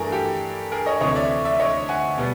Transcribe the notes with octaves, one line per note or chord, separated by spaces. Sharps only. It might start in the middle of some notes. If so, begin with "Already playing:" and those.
Already playing: G2 E3 A3 G#4 A#4
G4 A4
G#4 A#4
C#5 D#5
D2 C3 E3 A3 C4 C#5 D#5
D5 E5
D5 E5
C#5 D#5
F#5 G#5
B2 G3 B3